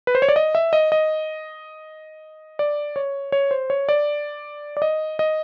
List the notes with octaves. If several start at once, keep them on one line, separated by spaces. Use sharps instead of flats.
B4
C5
C#5
D5
D#5
E5
D#5
D#5
D5
C#5
C#5
C5
C#5
D5
D5
D#5
D#5